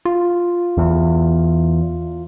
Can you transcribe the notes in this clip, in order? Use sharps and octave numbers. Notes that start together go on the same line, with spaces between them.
F4
E2